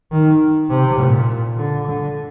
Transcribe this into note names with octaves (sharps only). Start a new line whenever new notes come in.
D#3
C3
A#2
D3
D3